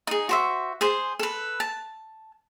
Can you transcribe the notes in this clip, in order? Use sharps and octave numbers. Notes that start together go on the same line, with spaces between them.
D#4 G#4
F#4 C5 E5
G#4 C5
A4 B4
A5